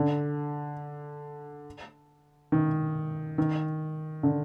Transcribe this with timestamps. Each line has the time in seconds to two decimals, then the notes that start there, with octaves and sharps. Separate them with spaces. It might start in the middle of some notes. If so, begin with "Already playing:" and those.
Already playing: D3
2.52 D#3
3.38 D#3
4.23 D3